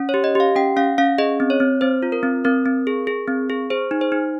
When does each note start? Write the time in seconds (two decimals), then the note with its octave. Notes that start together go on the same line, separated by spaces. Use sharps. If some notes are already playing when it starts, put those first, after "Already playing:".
Already playing: C#4
0.09 G4 C#5
0.24 D#5
0.35 G4 F5
0.55 C#4 G5
0.76 C#4 F5
0.98 C#4 F5
1.18 G#4 D#5
1.40 C4
1.50 C#5
1.60 C4
1.81 C4 C5
2.03 F4
2.12 A#4
2.23 C4
2.45 C4 A#4
2.66 C4
2.87 G#4
3.07 G#4
3.28 C4
3.50 G#4
3.70 G#4 C5
3.91 D#4
4.01 C5
4.12 D#4